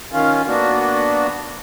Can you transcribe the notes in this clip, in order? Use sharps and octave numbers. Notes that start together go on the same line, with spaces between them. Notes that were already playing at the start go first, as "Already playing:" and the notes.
D#3 C#4 F4
A#3 B3 D4 F#4